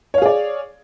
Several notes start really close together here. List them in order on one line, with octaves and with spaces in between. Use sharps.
C#5 F5 G#4 D5